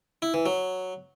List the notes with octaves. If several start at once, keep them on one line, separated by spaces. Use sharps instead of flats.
E4
E3
F#3